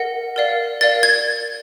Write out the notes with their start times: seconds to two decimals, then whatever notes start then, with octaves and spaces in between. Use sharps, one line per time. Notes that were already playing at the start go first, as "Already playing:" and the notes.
Already playing: A#4 D#5 F#5
0.36 A#4 D5 F5
0.81 A#4 D5 F5 A6
1.03 G#6